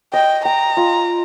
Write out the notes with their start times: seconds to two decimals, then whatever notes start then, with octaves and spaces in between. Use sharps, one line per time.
0.14 D#5 G5
0.45 G5 A#5
0.77 F4